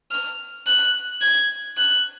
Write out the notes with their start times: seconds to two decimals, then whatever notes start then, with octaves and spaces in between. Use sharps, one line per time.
0.11 F6
0.67 F#6
1.21 G#6
1.77 F#6